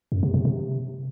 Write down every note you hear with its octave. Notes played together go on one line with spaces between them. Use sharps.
F#2
C3
C3
C3